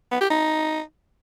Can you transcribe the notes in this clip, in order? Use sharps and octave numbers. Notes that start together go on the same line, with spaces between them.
B3
G4
D#4